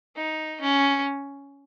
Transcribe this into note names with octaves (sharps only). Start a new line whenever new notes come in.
D#4
C#4